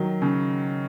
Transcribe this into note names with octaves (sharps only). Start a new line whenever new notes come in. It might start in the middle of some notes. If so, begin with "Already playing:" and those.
Already playing: D#3 F#3
C#3